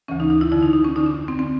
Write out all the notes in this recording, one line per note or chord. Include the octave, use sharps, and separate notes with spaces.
D2 C#3 E3 C#4
D#4
D#4
E4
F2 D3 E4
D#4
D#4
C#4
F2 D3 D#4
D4
C4
D3 C4